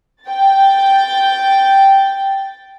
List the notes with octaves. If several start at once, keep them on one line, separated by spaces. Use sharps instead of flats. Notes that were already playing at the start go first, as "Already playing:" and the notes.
G5 A6